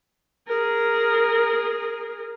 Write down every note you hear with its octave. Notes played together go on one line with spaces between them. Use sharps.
G#4 A#4